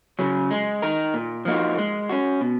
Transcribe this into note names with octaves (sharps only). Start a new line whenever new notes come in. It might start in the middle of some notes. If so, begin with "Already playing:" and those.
C#3 F#3 C#4
G#3
D#4 A#4
A#2
F3 A#3 D#4 F#4
G#3
C#4 F#4
B2